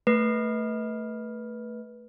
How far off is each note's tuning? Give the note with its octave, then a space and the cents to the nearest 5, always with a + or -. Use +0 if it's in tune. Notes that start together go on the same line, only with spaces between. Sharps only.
A3 +15 B4 -15